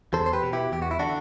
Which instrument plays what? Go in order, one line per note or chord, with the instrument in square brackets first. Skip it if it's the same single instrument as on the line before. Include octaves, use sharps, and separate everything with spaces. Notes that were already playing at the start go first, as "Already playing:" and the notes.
[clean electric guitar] E2 A4 C5
C5
G4 B4
B2
E4 G4
E2 G4
F#4
E4
D3 D4 F#4